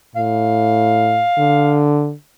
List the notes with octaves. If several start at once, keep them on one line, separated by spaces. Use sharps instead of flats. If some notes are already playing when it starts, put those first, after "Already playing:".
A2 F5
D3